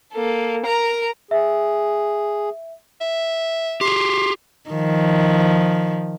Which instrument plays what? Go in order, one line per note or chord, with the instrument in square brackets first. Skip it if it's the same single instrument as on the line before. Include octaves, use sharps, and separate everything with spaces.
[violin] A#3 A4
A#4 A#5
[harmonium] G#4 [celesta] E5
[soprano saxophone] E5
[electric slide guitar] G4 G#4 [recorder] C6
[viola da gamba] D#3 F3